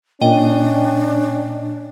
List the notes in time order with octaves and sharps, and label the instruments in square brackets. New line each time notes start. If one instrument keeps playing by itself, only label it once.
[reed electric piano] A#2 [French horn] C#4 [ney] D4 [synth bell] D#5 G5